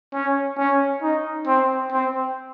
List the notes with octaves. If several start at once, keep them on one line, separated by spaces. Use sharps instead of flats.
C#4
C#4
D#4
C4
C4